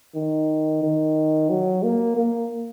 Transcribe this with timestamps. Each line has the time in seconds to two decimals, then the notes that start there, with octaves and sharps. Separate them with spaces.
0.15 D#3
0.83 D#3
1.50 F#3
1.83 A#3
2.17 A#3